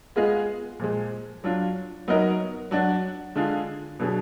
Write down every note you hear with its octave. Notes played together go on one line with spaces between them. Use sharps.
G#3 B3 F4 G#4 D#5
A#2 F3 G#3
F#3 D4 F4
F#3 B3 D#4 A#4 D#5
F#3 D4 F#4 D5
D3 G#3 D4 F4 G#4
B2 F#3 B3 D4 G#4